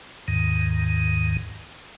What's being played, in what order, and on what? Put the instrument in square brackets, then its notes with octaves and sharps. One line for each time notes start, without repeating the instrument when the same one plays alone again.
[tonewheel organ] D#2 G#2 D#3